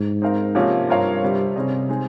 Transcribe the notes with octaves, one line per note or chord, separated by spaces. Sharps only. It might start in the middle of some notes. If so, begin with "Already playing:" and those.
Already playing: G#2
C4 D#4 A#4 F5
C3 F3 A#3 C#4
G2 C4 F4 A#4 C#5 F5
C3 G3 C4
C3 G3 C#4 G#4 C5 D#5
G#3 C4 D#4 G#4